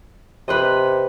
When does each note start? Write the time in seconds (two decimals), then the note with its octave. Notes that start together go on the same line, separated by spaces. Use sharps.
0.48 C3 B4 C5 D#5